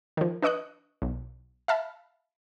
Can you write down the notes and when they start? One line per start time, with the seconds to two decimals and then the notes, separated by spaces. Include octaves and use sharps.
0.17 D#3 F3
0.42 D4 B4 D#5 C#6 D#6 F#6
1.02 B1
1.68 E5 F5 A5 B5